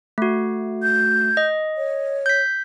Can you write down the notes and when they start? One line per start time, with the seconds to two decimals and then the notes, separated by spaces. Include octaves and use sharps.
0.18 A3 F#4
0.83 G6
1.37 D#5
1.77 C#5
2.26 G6 B6